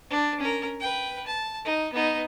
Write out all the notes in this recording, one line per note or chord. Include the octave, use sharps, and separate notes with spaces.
D4
C#4 A#4
B4 G5
A5
D#4
B3 D#4